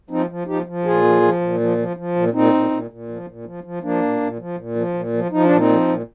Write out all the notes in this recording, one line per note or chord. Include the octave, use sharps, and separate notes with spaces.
F3 C4 D#4
F3
F3 D#4 G4
F3
A#2 F4 G#4
F3
F3
A#2
F3
F3
F3
A#2
A#2 C4 D#4
A#2
A#2
A#2
F3
A#2
F3
F3
F3 A#3 D4
A#2
A#2
F3
A#2
F3
A#2
F3
F3 D#4
D4
A#2
C4 D#4
F3
A#2